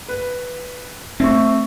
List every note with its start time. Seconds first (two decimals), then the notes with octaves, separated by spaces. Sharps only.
0.09 B4
1.20 A3 C4 C#6